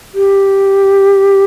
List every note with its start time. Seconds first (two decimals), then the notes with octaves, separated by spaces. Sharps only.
0.14 G4